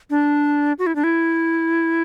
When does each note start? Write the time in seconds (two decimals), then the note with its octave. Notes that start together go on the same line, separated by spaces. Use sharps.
0.10 D4
0.79 F#4
0.87 E4
0.96 D4
1.04 E4